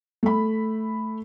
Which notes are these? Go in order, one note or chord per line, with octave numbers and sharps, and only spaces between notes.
A3 B5